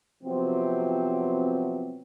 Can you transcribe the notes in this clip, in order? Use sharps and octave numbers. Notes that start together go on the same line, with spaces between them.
C3 F3 F#3 B3 C4